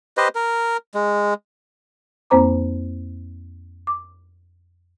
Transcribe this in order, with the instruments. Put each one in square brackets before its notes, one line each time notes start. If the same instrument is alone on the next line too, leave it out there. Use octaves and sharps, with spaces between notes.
[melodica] G4 B4 C5 D#5
A#4
G#3
[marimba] F2 A#3 C4 C5 A#5 D6
D6